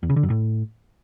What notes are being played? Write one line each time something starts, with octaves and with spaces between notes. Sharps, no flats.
E2
C#3
D3
F#2
A2